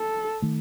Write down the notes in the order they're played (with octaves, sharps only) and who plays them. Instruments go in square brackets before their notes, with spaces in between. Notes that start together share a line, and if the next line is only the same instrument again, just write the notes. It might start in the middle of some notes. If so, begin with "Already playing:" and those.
Already playing: [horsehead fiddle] A4
[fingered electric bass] D#3 A3